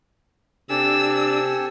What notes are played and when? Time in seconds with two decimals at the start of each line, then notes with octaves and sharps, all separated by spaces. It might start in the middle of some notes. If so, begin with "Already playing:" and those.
0.70 C3 D4 G4 A4 G#5 E6